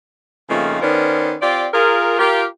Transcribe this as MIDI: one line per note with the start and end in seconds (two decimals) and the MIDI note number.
0.50 0.78 41
0.50 0.78 49
0.50 0.78 53
0.50 0.78 57
0.50 0.78 58
0.50 0.78 63
0.82 1.35 51
0.82 1.35 59
0.82 1.35 61
0.82 1.35 70
0.82 1.35 72
0.82 1.35 74
1.42 1.67 60
1.42 1.67 65
1.42 1.67 67
1.42 1.67 74
1.74 2.17 65
1.74 2.17 68
1.74 2.17 70
2.19 2.45 65
2.19 2.45 67
2.19 2.45 70